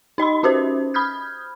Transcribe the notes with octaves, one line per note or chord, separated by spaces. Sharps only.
D#4 D#5 B5 C6
C#4 F#4 G4 C5
B5 D#6 F6 G6 G#6